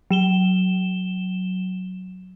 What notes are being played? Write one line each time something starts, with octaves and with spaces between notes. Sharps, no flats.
F#3 E7 G7